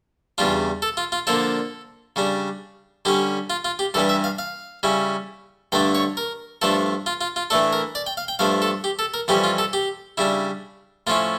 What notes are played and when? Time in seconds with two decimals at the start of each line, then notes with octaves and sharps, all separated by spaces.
0.38 E2 C#3 G3 D4 F4
0.82 A4
0.97 F4
1.12 F4
1.27 D3 F3 A#3 D4 A4
2.16 C#3 G3 D4
3.05 D3 G3 C#4 G4
3.50 F4
3.65 F4
3.79 G4
3.94 G2 E3 G3 D4 A4
4.09 E5
4.24 F5
4.39 F5
4.83 C#3 G3 C#4 E4
5.72 G2 D3 A3 D4 G5
5.95 C#5
6.17 A#4
6.62 G2 F3 A3 D4 A4
7.06 F4
7.21 F4
7.36 F4
7.50 A2 E3 A3 D4 A4
7.73 A#4
7.95 D5
8.07 G5
8.17 F5
8.28 G5
8.39 G2 F3 A3 D4 F5
8.62 A4
8.84 G4
8.99 A4
9.14 A#4
9.28 F2 E3 G3 C#4 G4
9.44 F4
9.58 A4
9.73 G4
10.17 C#3 G3 D4 E4
11.07 A2 F3 C#4 E4 F4